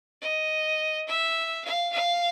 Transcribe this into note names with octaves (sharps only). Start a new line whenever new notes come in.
D#5
E5
F5
F5